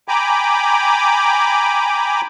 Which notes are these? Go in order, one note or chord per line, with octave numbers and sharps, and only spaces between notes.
G5 G#5 A#5 B5 D6